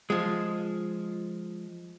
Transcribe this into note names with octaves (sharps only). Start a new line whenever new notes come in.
F3 G#3